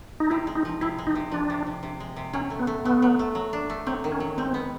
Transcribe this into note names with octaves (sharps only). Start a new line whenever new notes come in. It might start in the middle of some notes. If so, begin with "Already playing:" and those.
D#4
C3 E4
G#3
D#4
F3
C3 E4
G#3
D#4
C3
F3 D4
C3
C3
C3
G#3
C3
F#3 C#4
A3
B3
A3
A3 B3
F#3
A3
F#3
D4
A3
F#3 C4
D#3
C#4
F#3
G#3 C4
B3